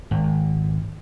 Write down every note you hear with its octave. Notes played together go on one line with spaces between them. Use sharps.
G#1